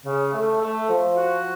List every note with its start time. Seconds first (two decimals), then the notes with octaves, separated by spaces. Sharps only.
0.05 C#3
0.33 A3
0.61 A3
0.88 F3
1.16 F#4